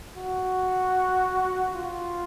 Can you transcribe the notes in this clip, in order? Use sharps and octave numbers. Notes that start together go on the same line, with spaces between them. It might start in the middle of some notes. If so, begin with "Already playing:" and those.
F#4
F4